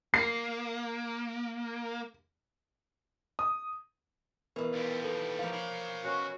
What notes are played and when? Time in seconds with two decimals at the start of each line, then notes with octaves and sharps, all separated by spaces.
0.14 A#3 C7
3.39 D#6
4.56 B2 E3 B3 A#4 B4
4.73 D#2 G3
5.04 A4 B4
5.39 F3 A#3 F5
5.53 C#5 B5
6.04 B2 C#4 F#4